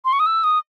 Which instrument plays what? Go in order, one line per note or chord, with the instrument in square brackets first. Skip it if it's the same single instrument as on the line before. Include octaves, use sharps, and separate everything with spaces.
[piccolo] C6
C#6
D#6
E6
D#6